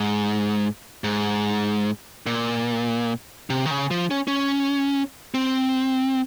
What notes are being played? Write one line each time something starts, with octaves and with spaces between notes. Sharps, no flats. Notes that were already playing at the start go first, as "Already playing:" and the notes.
Already playing: G#2
G#2
A#2
C3
D#3
C#3
F3
C#4
C#4
C4